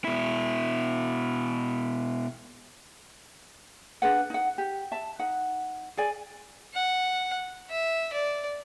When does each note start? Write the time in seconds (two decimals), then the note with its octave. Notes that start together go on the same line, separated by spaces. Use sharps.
0.04 B2 E4
4.02 D4 G#4 B4 F#5
4.30 D#4 F#5
4.58 G4
4.92 E5 A5
5.19 D#4 F#5
5.97 G#4 D5 G#5
6.74 F#5
7.71 E5
8.13 D5